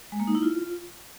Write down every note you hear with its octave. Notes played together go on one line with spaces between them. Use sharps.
G#3
A#3
D#4
E4
F4